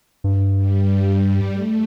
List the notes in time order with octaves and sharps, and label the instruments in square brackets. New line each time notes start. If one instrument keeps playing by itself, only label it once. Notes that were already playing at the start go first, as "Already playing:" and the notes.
[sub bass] G2 [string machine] G3
[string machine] G3
A3